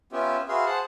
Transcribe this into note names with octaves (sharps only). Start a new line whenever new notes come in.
B3 C#4 F4 G4 E5
F#4 G#4 B4 E5 F5 C6
G#4 C5 F#5 A5 F#6